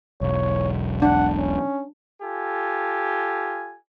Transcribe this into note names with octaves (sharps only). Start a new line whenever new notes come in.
E1 B1 C#5
D4 F#5
C#4
F4 G4 A4 G#5